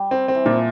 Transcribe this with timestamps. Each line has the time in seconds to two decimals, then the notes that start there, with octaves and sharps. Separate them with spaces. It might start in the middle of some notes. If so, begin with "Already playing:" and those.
Already playing: G3
0.11 C4
0.28 C4
0.35 E3
0.46 A#2 F3